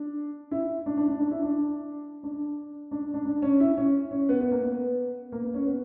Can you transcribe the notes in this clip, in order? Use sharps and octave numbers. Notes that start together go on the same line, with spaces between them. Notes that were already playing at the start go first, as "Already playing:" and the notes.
Already playing: D4
E4
D4
D4
D4
D4
E4
D4
D4
D4
D4
D4
C#4
E4
C#4
C#4
B3
B3
A#3
B3
A#3
B3
C#4
B3